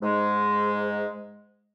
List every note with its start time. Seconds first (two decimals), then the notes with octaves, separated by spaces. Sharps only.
0.02 G#2 G#3